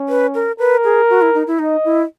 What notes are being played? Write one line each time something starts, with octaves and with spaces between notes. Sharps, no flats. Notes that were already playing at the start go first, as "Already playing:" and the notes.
Already playing: C#4
B4
A#4
A#4 B4
G#4
F#4
E4
D#4
E4
D#4 D#5
E4